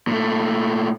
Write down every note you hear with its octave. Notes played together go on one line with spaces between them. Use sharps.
A#2 A3